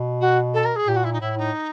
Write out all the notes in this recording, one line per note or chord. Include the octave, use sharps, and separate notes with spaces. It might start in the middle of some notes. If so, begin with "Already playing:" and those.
Already playing: B2
F#4
A4
A#4
G#4
A#2 G4
F#4
E4
D#4
A2 E4
D#4